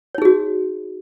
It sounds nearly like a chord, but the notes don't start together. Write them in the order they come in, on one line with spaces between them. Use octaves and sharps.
C#5 D#4 G#4 F#4